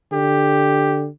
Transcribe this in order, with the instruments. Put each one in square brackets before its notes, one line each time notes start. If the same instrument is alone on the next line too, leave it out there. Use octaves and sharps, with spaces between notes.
[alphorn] D3 [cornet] G4